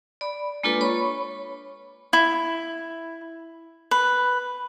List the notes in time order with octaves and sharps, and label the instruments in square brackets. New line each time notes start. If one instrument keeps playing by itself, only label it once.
[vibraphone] D5 B5
G#3 A#3 D4 F4 A4 B4
C#5 B5 C#6
[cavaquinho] E4
B4